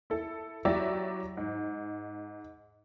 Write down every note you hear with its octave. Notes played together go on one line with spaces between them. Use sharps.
E4 A4
F#3 E4 G4 D5 E5
G#2